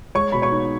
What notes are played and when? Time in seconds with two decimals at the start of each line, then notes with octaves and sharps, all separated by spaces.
0.15 G#3 C#5 C#6
0.32 B2 B5
0.42 C#5 C#6
0.52 D#4